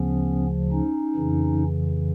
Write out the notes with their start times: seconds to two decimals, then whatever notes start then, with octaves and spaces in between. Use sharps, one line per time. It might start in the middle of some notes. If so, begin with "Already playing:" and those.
Already playing: D2 C#3 F3 B3 C#4
0.72 C#4 D#4
1.15 F2 C#3 E3